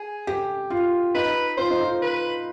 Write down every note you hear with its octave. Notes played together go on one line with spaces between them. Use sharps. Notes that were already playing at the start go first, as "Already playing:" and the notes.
Already playing: G#4
G4
F4
D#4 B4
F4 C5
D#4
F4
B4